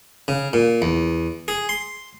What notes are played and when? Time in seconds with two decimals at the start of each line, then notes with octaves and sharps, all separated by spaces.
0.28 C#3
0.53 A#2
0.82 E2
1.48 G#4
1.69 C6